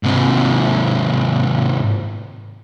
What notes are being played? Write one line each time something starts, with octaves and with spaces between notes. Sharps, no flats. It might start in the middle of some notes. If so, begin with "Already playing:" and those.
G#2 C3